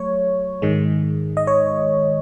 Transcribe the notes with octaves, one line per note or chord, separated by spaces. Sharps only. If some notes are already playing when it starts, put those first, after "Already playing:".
Already playing: F#3 A3 C#5
G#2 D#3 G#3
D#5
C#5